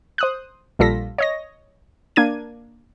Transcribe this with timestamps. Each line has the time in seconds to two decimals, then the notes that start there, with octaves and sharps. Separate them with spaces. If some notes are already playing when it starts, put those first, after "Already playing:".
0.18 C5 D#6 F#6
0.79 A#1 G3 F4 A4 A#6 B6
1.18 C#5 D#5 A#6
2.16 A#3 D4 G#6 D#7